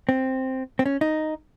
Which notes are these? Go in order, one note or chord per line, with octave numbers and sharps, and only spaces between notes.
C4
C4
C#4
D#4